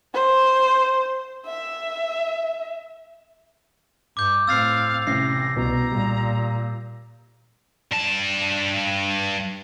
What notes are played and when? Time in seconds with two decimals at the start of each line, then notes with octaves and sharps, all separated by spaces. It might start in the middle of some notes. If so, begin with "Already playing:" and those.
0.14 C5
1.46 E5
4.17 G2 D6 G6
4.48 A2 C4 F5 E6 A6 C7
5.07 A1 C3 A#6 C7
5.57 C2 B2 A#5
5.92 A#2 G3
7.91 G2 A5